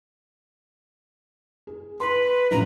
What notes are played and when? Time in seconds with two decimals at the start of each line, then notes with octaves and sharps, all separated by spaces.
1.67 G#4
2.00 B4 C6
2.51 A#1 F#2 A2 A#5